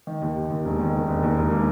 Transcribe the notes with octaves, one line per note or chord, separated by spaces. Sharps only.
D#3
D#2
D#2
D#2
E1
D#3
D#2
E1
D#2
E1
A#3